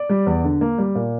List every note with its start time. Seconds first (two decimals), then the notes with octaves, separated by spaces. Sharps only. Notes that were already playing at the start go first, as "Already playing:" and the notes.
Already playing: D5
0.10 G3
0.26 E2
0.44 D3
0.61 A#3
0.78 G3
0.95 A#2